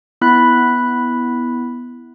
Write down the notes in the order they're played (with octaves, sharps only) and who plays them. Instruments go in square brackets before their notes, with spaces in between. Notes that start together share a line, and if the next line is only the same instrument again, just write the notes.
[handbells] B3 E4 B5 F#6 B6